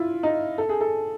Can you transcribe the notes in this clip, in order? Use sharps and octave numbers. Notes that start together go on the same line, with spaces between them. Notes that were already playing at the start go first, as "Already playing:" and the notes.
Already playing: E4 F4
D#4
A4
G#4
A4